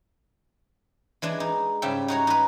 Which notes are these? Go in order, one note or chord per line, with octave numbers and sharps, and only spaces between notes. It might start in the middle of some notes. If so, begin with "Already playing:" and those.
E3 G#3 D4
D#4
G#2 C#3 G3 G4 E5 G5
D#4 F#4 C#5 A#5
D#4 B4